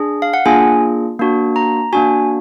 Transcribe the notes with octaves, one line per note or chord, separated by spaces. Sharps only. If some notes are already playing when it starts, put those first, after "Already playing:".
Already playing: D4 G#4
F5
F#5
A#3 D4 F4 G#4 G#5
A#3 D4 F#4
A#5
A#3 D4 F#4 G#5